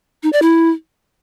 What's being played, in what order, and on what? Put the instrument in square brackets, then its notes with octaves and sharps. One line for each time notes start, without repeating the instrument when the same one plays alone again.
[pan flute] D#4
D5
E4